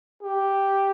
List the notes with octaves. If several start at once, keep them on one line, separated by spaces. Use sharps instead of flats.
G4